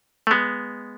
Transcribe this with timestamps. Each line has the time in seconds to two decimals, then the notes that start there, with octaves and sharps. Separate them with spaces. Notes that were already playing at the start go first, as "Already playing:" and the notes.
0.27 A3
0.31 G#3 B3